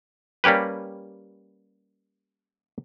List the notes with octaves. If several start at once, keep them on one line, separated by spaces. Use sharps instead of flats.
G3 A#3 C#4 G4 B4